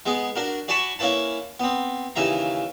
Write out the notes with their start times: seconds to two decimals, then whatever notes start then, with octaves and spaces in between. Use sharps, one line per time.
0.06 G#3 B3 G#4
0.36 D4 F#4 A#4
0.68 F#4 D5 G#5 A5 B5 C#6
0.99 A#3 C#4 E4 B4 A5
1.60 B3 C4
2.16 D#2 C#3 E3 E5 A#5